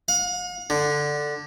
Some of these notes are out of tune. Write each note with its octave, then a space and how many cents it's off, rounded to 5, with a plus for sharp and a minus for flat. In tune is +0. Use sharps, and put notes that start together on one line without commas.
F5 +45
D3 +5